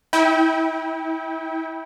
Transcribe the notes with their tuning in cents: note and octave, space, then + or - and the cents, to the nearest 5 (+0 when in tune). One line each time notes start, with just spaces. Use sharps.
E4 -30 G5 +0